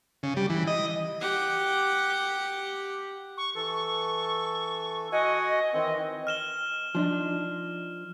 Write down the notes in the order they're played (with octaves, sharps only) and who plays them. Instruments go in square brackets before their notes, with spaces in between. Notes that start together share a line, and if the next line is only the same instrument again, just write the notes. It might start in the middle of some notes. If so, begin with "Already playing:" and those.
[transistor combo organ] C#3
G3
E3
D#5
[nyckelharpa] G4 F#5
[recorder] C#6
[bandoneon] E3 A4 [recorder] C#6
[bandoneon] F#4 F#5 G#5 [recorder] D#5
[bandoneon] D#3 E3 C4
[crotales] F6 E7 G7
[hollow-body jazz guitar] F3 D4 D#4